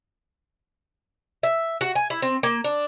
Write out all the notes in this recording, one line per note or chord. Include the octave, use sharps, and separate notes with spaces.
E5
F#4
G#5
E4
C4
A#3
D4